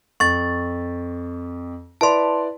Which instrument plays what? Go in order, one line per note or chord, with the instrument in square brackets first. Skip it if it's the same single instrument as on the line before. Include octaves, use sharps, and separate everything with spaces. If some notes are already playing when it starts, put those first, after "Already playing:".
[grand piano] F2 [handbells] C#6 A6
[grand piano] E4 B4 D5 [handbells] A5 C6